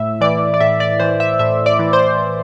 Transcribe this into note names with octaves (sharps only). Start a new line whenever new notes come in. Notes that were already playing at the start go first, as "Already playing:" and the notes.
Already playing: A2 E5
E3 D5
D5
A2 E5
D5
E3 C5
E5
A2 E5
D5
E3
C5